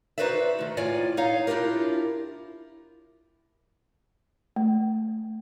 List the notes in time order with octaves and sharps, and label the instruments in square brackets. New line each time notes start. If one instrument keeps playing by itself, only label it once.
[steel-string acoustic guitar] D#4 F#4 B4 C5 D5 E5
D#3 A3
A2 F4 C#5 D5 G#5
D#4 C#5 F5
D4 E4 F4 G4 A#4
[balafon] A3